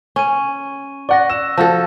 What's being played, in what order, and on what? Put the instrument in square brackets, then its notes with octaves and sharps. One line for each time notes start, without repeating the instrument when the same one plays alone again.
[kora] C#4 [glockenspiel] C#6 D#7
[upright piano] D5 F#5 [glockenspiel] C#6 F#6 A#6
[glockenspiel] E6 [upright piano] E7
[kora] F3 F#4 A4 [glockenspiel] A5